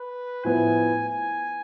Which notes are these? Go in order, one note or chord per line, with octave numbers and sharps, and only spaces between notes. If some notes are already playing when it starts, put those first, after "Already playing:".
Already playing: B4
A2 F3 B3 E4 G#5
G#5